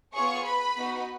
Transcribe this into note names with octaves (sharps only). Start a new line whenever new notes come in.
B3 F4 G#4 C#5 C#6
B4 B5
B3 D#4 F#4